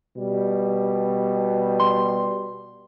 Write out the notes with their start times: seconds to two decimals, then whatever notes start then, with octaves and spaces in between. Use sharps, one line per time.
0.16 B2 G3
1.80 C6